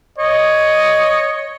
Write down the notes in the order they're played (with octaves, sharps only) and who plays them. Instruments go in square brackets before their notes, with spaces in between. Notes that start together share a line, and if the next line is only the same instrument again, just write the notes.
[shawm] C#5 [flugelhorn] D#5